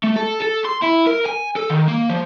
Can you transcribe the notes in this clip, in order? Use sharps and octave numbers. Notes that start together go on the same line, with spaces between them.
A3
A4
A4
C6
E4
A#4
G#5
A4
D#3
A#3
F3